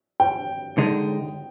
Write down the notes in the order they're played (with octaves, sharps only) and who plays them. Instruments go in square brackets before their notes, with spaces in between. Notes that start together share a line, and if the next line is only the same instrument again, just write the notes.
[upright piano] G5
[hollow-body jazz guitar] D3 G#3 D#4